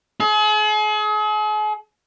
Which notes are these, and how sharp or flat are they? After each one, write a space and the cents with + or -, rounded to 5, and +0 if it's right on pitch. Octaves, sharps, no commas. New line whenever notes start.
G#4 +40